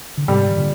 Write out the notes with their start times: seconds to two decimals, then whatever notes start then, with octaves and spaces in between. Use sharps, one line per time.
0.17 D3
0.28 G#2 C3 G3
0.50 D#3
0.57 A#2 D3